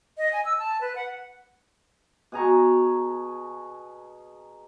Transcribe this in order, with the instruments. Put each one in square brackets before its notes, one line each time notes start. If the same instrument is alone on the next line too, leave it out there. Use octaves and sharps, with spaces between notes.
[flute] D#5
G#5
E6
A5
B4
F#5
[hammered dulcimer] B2 G#4 A#5 C#6